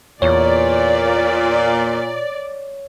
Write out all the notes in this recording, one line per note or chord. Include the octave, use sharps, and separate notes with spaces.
E2 A#2 C#5 D5